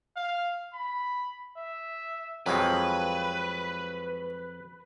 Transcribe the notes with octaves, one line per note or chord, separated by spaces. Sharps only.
F5
B5
E5
F2 F3 F#3 G#3 B4